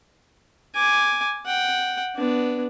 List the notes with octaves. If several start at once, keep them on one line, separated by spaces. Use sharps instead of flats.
G#5 D6
F#5 G5
B3 D4